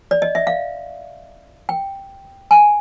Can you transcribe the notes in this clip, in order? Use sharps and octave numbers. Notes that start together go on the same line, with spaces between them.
D5
D#5
E5
F5
G5
G#5